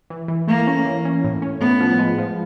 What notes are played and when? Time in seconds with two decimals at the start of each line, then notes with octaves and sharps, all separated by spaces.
0.10 E3
0.28 E3
0.47 A3 A#3
0.67 C#4
0.85 E3
1.05 C#4
1.24 A2
1.42 C#4
1.61 A2 B3
1.80 F3
1.99 G#3
2.18 F3